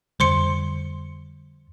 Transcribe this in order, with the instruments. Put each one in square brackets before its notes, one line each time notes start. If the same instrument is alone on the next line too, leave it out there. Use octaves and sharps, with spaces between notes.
[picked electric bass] F2 D3 G3 [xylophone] C5 C6 C#7